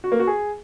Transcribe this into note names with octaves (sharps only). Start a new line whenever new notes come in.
F#4
A#3
F#4
G#4